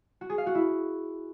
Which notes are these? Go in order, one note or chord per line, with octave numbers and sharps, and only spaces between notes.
F#4
G#4
F5
F#4
E4